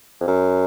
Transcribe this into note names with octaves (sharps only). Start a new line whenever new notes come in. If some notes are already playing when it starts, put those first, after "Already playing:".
F2
F#2